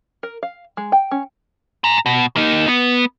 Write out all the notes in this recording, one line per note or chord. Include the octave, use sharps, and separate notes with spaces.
A#4
F5
G#3
G5
C#4
G#5 A#5
B2
A#3 D#4
B3